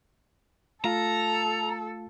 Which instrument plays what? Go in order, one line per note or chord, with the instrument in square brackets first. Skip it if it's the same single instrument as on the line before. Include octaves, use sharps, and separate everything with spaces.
[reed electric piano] A3 F4 F5 [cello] A4 [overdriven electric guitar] A#5